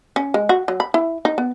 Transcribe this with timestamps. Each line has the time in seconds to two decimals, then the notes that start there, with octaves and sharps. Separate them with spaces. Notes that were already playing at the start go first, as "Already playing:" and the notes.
0.16 C#4
0.34 G#3
0.49 F#4
0.68 F#3
0.80 B5
0.94 E4
1.25 D#4
1.38 B3